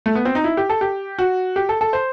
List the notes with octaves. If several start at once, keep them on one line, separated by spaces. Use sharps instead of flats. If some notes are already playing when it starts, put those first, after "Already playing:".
A3
B3
C4
D#4
E4
G4
A4
G4
F#4
G4
A4
A4
C5